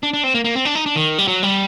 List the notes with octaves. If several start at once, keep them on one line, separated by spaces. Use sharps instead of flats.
D4
D4
C4
A#3
A#3
C4
D4
D#4
D4
D#3
G3
F#3
G3